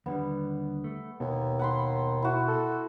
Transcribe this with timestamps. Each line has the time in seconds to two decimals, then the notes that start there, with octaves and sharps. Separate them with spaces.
0.06 D#2 D3 G3 B3
0.84 A3
1.20 D#2 B2
1.59 F#5 B5 C6
2.22 E4 F#4
2.48 A4